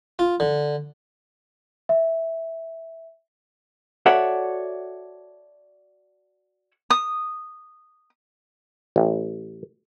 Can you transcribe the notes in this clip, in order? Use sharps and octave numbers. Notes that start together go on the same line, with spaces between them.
F4
D3
E5
F#4 A4 C#5 D5 E5 F#5
D#6
A1